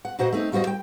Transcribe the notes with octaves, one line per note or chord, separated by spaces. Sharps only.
F#5
A#2 F#4 C5 D#5 F#5
A3 C4 D#4
F2 G3 F#4 C5 D#5
G5